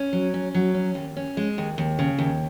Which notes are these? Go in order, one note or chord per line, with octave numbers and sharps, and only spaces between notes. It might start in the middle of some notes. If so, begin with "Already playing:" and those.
Already playing: C#4
F#3
C#4
F#3
C#4
D#2
C#4
G#3
D#2
D#2
C#3
D#2